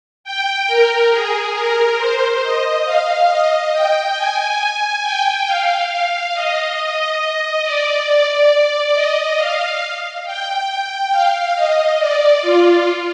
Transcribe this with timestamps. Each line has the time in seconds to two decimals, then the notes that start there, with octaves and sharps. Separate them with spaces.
0.24 G5
0.67 A#4
1.11 G#4
1.55 A#4
1.98 C5
2.42 D#5
2.85 F5
3.29 D#5
3.73 G5
4.16 G#5
5.02 G5
5.47 F5
5.90 F5
6.34 D#5
7.64 D5
8.94 D#5
9.37 F5
10.25 G5
11.12 F5
11.55 D#5
11.99 D5
12.42 F4